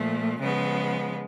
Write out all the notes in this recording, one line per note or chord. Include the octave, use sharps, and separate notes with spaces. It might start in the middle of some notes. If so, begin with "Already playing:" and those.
Already playing: A#2 F3 A3
C#3 F3 G#3 B3